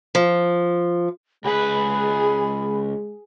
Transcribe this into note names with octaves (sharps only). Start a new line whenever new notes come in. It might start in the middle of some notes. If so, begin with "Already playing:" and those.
F3
C#2 G#3 G#4 B4 B5